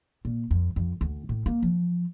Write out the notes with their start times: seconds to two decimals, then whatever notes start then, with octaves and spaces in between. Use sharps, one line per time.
0.25 A#2
0.51 F2
0.76 F2
1.01 D2
1.29 A2
1.46 A#3
1.63 F3